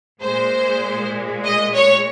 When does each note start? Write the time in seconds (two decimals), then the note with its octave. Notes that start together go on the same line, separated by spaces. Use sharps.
0.21 A#2 G#3 C5
1.44 D#5
1.74 C#5